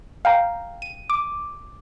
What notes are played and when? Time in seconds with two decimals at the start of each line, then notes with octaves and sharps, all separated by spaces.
0.25 F5 G5 A#5
0.82 D#7
1.10 D6